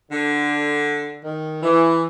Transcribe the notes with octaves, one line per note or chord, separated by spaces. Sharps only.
D3
D#3
E3